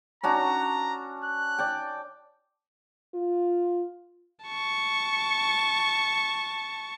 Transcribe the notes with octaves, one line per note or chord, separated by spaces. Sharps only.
C#4 D4 F#4 A#5
F#6
D5 G5
F4
A5 C#6